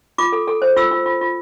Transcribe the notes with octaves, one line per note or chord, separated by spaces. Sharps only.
F4 D6
A4
A4
C5
F4 E6
F4
F4
F4